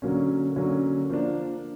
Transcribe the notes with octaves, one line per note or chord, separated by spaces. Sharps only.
D3 F#3 A#3 C#4
D3 F#3 A#3 C#4
F3 A#3 D4